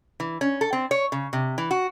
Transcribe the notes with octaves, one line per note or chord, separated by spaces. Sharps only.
E3
C#4
A4
C4
C#5
C#3
C3
E3
F#4